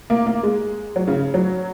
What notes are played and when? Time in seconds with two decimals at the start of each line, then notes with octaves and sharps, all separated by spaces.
0.10 A#3
0.26 A#3
0.43 G#3
0.96 F#3
1.07 C#3
1.34 F#3